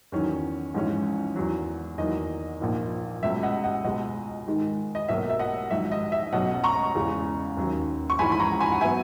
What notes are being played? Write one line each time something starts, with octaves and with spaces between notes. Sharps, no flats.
E2 D#3 F#3 C#4
A#1 G#2 E3 G#3 C#4
E2 D#3 F#3
E2 D#3 F#3 A#3 D#5
A#1 A#2 A#3 D#4
C#2 B2 F#3 C#4 E5
D#5 F#5
D#5 F#5
C#2 B2 G#3 D#5
G#2 D#3 G#3 D#4
D#5
B1 B2 F#3 A#3 E5
E5
D#5 F#5
A#1 G#2 D#3 F#3 E5
D#5
E5
B1 B2 F#3 C#4 D#5 F#5
A#5 C#6
E2 C#3 G#3
D#2 D#3 F#3 C#4
C#6
A#1 G#2 E3 G#3 C#4 G#5 B5
B5
A#5 C#6
G#5 B5
F#5
F#3 B3 E5 G#5